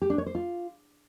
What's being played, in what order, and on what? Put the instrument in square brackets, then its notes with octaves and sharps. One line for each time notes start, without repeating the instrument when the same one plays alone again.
[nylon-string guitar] G4
D4
C#5
C5
F4